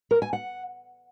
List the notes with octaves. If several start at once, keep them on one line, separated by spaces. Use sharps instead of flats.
A#4
G#5
F#5